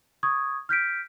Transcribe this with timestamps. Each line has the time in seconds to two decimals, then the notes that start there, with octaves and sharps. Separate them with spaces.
0.23 C#6 D#6 G#6
0.69 F6 G6 B6 D7